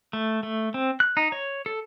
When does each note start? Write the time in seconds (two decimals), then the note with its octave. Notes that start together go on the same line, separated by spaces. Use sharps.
0.13 A3
0.43 A3
0.74 C4
1.00 F#6
1.17 D#4
1.32 C#5
1.66 A4